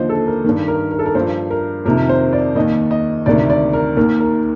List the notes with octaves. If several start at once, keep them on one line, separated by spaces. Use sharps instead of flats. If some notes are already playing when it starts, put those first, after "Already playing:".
Already playing: D#2 D3 F3 C5 D#5
A4
A#4
G2 D#3
A#4
A#4
A4
A#4
G2 F3 C5
A#4
F2 C3 D#3 A#4
C5
D5
D#2 D#3 D#5
D#5
D2 C3 D#3 D5
D5
A#4
D#2 D#3 A#4
A#4